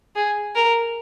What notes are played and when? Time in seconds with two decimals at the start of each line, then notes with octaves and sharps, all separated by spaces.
0.15 G#4
0.55 A#4